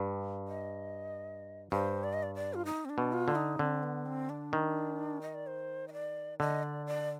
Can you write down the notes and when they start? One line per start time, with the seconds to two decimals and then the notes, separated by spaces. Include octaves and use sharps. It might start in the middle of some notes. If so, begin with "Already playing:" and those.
Already playing: G2
0.48 D#5
1.72 G2 C5
2.04 D5
2.13 D#5
2.23 D5
2.35 D5
2.54 F4
2.66 D#4
2.85 C4
2.90 D4
2.98 B2
3.13 F4
3.28 D3
3.35 D#4
3.59 D3 C4
3.83 B3
4.06 C4
4.29 D4
4.53 D#3
5.22 D#5
5.34 D5
5.47 C5
5.88 D#5
5.93 D5
6.40 D3 D#5
6.63 D5
6.87 D5